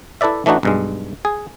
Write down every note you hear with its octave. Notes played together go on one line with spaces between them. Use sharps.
E4 A4 B4 D5 E5
E3 A3 D4 D#4 F#4
B1 G2 G#3
G#4